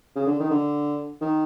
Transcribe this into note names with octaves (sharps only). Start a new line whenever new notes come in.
C#3
D3
D#3
D3
D#3